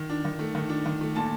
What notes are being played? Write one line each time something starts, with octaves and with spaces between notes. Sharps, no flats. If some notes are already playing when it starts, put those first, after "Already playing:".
Already playing: D#3
D4
D#3
A3
D#3
D4
D#3
A3
A#2 A5